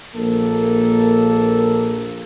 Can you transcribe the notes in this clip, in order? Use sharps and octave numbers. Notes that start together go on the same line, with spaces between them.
A#1 A#3 A4